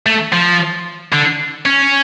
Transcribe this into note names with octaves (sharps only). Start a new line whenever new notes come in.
A3
F3
D3
C#4